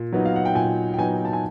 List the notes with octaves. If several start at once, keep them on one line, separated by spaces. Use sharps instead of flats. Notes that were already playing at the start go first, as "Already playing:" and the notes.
Already playing: A#2
F#3 B3 D#4
F5
F#5
G5
A#2 G#5
G5
F#3 B3 D#4 G#5
A5
G#5